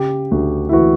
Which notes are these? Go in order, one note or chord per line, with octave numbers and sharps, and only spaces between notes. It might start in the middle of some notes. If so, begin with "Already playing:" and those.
Already playing: C#3 G4
D2 F#4
E4
E3 F#4